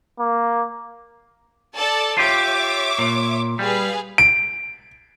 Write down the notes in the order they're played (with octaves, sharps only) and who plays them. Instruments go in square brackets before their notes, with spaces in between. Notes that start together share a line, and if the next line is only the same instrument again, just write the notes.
[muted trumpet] A#3
[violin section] A4 D5 A5
[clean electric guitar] F4 G4 [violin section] C#5 E5 D6
[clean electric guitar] A#2
[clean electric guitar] G3 [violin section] G#4 B4 F5
[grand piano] D7